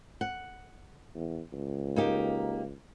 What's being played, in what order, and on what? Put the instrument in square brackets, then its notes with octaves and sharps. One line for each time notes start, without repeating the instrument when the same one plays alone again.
[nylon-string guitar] F#5
[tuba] E2
C#2
[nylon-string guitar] A#3 D#4 G4